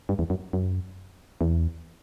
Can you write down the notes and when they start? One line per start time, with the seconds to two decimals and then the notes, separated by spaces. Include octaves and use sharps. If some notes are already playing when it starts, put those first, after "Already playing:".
0.09 G2
0.19 E2
0.30 F#2
0.53 F#2
1.41 E2